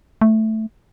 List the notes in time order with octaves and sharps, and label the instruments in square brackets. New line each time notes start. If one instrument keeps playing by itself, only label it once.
[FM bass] A3